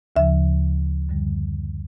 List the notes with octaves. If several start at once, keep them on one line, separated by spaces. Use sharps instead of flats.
D2 C#3 F3 E5
F#2 D3 G3